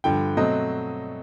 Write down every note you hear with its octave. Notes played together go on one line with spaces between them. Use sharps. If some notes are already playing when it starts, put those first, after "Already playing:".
G2 D3 F3 G5
B2 F#3 A3 C4 D#5